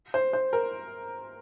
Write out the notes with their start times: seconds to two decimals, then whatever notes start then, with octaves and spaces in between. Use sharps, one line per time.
0.14 C5
0.33 C5
0.53 A#4